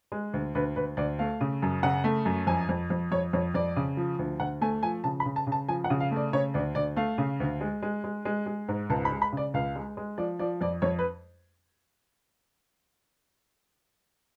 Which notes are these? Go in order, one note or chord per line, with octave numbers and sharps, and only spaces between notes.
G#3
D2
D2 B4
D2 B4
D2 D5
A3 F5
C#3
F#2
C#3 F#5
A3
F#2
F2 G#5
F2
F2
F2 C#5
F2 C#5
F2 D5
C#3
F3
D2
D2 F#5
A3 G#5
F3 G#5
C#3 A5
B5
C#3
A5
C#3
A5
F3 G#5
F#5
C#3
F5
A3
D5
C#3 C#5
D2 D5
D2 D5
A3 F5
C#3
D2
G#3
G#3
G#3
G#3
G#3
G#2
C#2 A5
B5
G#3
B5
C#3 D5
C#2 F5
G#3
G#3
F3 D5
F3 D5
F2 D5
F2 C#5
B4